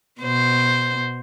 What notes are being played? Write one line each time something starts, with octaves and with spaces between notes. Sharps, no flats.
B2 C5